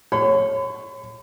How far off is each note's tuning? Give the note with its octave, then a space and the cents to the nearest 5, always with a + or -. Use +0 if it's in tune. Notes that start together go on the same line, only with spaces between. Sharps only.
C#5 -15 B5 +40